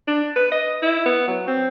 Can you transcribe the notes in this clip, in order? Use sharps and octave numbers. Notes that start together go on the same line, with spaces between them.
D4
B4
D#5
E4
B3
F#3
C4